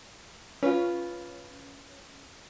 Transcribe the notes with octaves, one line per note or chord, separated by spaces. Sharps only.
C#4 F4 B4